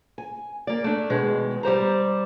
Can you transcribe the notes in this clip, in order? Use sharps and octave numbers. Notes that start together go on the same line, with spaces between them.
G#5
A#3 D5
A3 D4
B2 D#3 G#3
G3 G4 C5 A#5